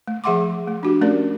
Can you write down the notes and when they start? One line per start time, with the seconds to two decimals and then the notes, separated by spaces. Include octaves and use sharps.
0.08 A3
0.24 F3 G#4 E5 F#5 C6 D6
0.68 A3
0.83 D4 F#4 G4
1.01 A3 C#4 A#4 D5